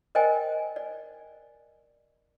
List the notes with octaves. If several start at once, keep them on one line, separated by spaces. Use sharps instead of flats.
A#4 C5 D5 D#5 G5 G#5
D5